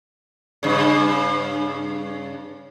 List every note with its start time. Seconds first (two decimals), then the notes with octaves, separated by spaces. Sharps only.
0.63 G2 C#3